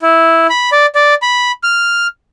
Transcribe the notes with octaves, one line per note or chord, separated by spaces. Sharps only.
E4
B5
D5
D5
B5
F6